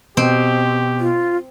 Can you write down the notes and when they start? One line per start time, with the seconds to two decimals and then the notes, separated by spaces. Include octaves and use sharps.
0.17 B2 C4 G4
1.00 F4